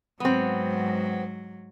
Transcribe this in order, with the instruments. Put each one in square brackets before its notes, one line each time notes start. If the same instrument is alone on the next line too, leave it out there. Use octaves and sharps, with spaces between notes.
[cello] G#2 F#3 [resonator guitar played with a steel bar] B3 C4